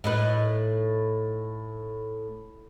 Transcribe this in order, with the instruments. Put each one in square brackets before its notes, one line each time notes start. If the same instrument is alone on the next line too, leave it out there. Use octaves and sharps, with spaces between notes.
[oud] A2 D#4 B4